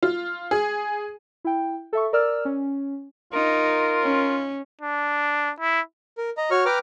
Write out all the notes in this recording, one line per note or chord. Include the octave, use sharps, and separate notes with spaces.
F4
G#4
E4 G5
A4 E5 C#6
A#4 D5 E6 F6
C#4
D#4 F4 A#4
C#4
D4
E4
A#4
D#5 A#5
F#4 C#5 C#6 F6
B4 G5 A#5 D6 F6